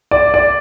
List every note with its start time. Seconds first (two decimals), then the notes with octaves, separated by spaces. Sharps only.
0.11 D5
0.34 D5